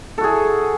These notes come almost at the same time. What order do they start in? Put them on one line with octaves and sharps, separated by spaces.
A4 F#4 G#4